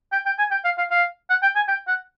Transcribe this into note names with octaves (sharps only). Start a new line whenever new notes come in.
G5
G5
G#5
G5
F5
F5
F5
F#5
G5
G#5
G5
F#5